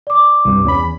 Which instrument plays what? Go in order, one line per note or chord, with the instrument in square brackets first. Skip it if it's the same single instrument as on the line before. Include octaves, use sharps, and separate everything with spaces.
[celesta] D5 D6
[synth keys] C2 G2
E2 C#4 B5